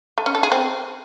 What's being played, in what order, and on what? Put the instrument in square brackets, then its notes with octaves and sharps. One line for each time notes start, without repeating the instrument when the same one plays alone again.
[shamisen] A3
C#4
A4
G#4
C4